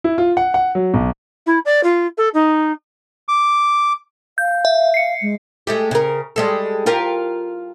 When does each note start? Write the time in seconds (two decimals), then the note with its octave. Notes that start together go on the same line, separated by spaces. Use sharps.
0.04 E4
0.18 F4
0.37 F#5
0.54 F#5
0.75 F#3
0.94 B1
1.46 E4
1.65 D5
1.83 F4
2.17 A4
2.34 D#4
3.28 D6
4.38 F5 G6
4.65 E5
4.94 F5 C7 C#7
5.21 G#3
5.67 G#3 A3 G4
5.91 C#3 A#4
6.36 G3 G#3 A4
6.86 F4 G4 A#4